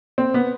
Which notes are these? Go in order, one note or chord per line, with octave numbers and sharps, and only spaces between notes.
C4
B3